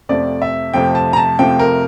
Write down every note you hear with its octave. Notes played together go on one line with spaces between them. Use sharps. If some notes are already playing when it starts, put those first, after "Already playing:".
F2 C3 F3 A3 D5
E5
F2 C3 F3 A3 G5
A5
A#5
A5
F2 C3 F3 A3 G5
A#4